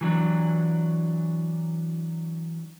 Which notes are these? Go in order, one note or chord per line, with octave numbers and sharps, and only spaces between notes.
E3 F#3 D4